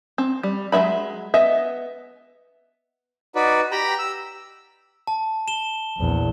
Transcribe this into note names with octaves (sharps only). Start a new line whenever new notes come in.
C4
G3
F#3 G#3 A#3 E5 B5
B3 D#5 E5
D#4 F#4 B4 D5
G4 G5 A#5 B5
E6
A5
E7 G7
A#1 E2